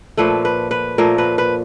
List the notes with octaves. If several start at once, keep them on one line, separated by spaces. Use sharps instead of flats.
A#2 F3 A3 B4
B4
B4
A#2 F3 A3 A#4
B4
B4